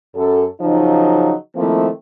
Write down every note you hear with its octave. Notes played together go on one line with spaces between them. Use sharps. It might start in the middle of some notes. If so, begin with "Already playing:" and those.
F#2 A4
C#3 F3 F#3 D#4
D#3 F3 A3 A#3 C4 E4